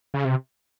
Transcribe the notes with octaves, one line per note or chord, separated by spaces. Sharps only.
C#3
C3